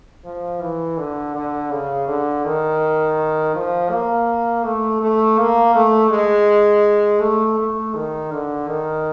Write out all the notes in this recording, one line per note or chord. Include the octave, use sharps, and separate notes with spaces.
F3
E3
D3
D3
C#3
D3
D#3
F3
A#3
A3
A3
A#3
A3
G#3
A3
A3
D#3
D3
D#3